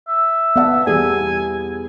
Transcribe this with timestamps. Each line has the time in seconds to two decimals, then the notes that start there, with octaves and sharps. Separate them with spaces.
0.08 E5
0.56 B3 D5 F#5 A5
0.87 E2 G3 G#4 G#5